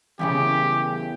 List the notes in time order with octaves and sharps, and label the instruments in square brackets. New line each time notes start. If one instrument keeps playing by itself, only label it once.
[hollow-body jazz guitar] E2 A#2 C#3 [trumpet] G4